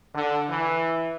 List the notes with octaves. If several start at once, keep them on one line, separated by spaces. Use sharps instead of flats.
D3
E3